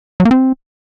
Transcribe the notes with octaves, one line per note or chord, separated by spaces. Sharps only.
F#3
A#3
C4